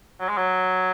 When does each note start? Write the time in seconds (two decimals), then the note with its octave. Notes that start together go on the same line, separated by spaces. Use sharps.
0.20 F#3
0.28 G#3
0.37 F#3